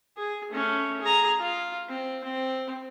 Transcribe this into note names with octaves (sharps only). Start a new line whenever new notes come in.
G#4
A3 C#4
G#4 A#5
F4
C4
C4